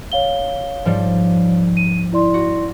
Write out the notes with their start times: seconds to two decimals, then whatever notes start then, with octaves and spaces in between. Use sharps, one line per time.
0.12 C#5 F5 G7
0.85 G#2 F3 G3
1.77 D#7
2.13 E4 D5 C6
2.34 F#4